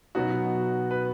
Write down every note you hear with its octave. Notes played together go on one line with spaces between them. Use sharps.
B2 F#3 B3 D#4 F#4
B4